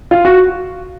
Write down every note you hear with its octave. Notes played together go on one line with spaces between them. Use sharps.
F4
F#4